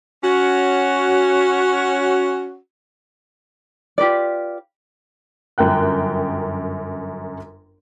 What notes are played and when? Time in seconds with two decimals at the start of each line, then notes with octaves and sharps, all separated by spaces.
0.23 C#4 F#4
3.98 F4 G4 B4 D5
5.58 G1 F#2 A#4 G5 F#6